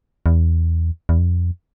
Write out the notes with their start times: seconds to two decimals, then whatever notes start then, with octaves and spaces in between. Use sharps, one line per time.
0.26 E2
1.09 E2
1.18 F2